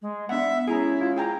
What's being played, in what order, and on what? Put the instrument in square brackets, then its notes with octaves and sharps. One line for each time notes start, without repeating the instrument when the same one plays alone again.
[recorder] G#3
[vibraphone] B3 [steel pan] D4 F#5 [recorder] E5
[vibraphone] G#3 C#4 C#5 [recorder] E4 [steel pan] G#4 A#5
[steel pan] F4
G#4 G5 A#5